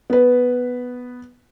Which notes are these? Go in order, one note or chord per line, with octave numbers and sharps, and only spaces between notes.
B3 B4